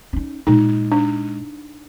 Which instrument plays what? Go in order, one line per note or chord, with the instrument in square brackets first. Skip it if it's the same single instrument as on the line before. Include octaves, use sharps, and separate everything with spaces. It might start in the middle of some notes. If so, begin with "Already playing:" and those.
[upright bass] C#4 D#4
[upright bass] A#2 G#3 [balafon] D#4
[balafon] D4